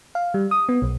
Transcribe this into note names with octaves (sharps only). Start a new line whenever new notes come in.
F5
G3
D#6
B3
B1